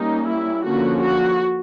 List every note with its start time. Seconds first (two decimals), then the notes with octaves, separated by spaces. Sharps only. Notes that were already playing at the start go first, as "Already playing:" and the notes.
Already playing: G3 A#3 C#4 D#4
0.27 E4
0.63 D3 F3 A#3 C#4 F#4
1.00 F#4